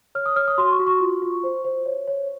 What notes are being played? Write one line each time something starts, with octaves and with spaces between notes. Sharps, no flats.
C#5 F6
D#6
C#5 F6
D#6
F#4 C6
C#6
F#4
C#6
F4
F4
C5
C5
C#5
C#5